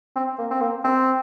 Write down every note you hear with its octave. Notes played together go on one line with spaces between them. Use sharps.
C4
A#3
C4
A#3
C4